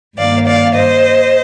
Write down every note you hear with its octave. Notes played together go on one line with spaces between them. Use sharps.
G2 D#3 A#3 D5 F5
D5 F5
C5 D#5